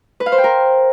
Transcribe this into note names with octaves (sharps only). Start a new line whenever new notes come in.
B4
F5
C5
G5
A#4